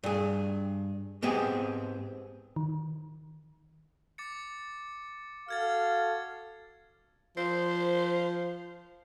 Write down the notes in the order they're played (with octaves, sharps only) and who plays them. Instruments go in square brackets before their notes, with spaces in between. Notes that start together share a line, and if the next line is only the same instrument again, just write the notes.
[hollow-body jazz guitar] G2 G#4
G#2 B3 C4 G4 G#4
[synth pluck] D#3
[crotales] D6 A6 C#7
[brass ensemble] F#4 A4 F5 [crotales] F6 G#6 A6
[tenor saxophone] F3 [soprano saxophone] C5